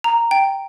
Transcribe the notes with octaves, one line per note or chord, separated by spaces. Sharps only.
A#5
G5